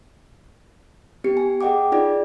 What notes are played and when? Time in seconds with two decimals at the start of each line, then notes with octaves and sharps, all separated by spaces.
1.24 B3 G4 C#7
1.37 G#5
1.61 G#4 D#5 F#5 G5 D6
1.92 D#4 F4 G#4 D5